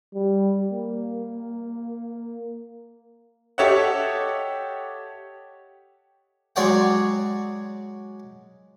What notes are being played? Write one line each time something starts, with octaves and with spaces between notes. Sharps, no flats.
G3
A#3
G4 A4 C#5 D#5 E5 F#5
F#3 G#3 C#5 D5 F#5 G5